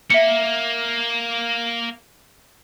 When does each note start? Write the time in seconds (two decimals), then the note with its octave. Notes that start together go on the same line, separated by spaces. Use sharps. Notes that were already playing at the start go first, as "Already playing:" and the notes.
0.10 A#3 E5 C#7